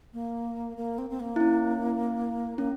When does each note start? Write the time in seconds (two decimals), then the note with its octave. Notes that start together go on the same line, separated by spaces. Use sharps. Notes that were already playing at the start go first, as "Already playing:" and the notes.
0.13 A#3
0.77 A#3
0.98 C4
1.10 C4
1.20 A#3
1.36 E4
1.40 C#4
2.58 A#3 C#4